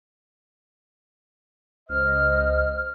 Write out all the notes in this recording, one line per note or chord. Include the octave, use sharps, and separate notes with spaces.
C#2 C5 D#5 F6